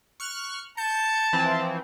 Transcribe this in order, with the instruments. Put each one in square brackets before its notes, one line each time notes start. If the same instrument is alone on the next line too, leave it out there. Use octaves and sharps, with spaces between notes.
[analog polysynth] C#6 F6 F#6
[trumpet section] A5 [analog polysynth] G6 C#7
[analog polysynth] E3 F3 C4